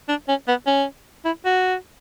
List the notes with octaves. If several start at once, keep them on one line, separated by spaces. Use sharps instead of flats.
D4
C#4
B3
C#4
E4
F#4